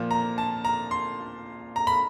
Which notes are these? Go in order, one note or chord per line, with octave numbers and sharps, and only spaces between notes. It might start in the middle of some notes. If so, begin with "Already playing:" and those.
Already playing: A#2 F3
A#5
A5
A#5
C6
A#5
B5